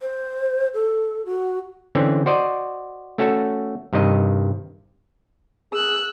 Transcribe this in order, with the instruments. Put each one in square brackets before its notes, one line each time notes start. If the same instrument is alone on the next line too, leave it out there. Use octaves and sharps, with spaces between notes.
[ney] C5
A4
F#4
[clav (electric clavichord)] D3 E3 C4 C#4
F#4 C5 D5 D#5
A3 C#4 F#4 A4
G2 C3 D#3 D#5
[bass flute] G#4 [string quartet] E6 F#6